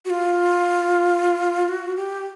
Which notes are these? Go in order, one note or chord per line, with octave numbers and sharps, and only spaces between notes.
F#4
F4
F#4
G4